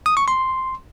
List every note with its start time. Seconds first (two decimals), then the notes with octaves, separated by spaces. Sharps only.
0.06 D#6
0.17 C#6
0.28 C6